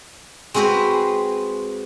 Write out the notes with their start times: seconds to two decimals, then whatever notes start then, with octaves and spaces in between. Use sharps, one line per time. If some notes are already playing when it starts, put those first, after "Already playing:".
0.54 G#3 C4 F#4 B4 C5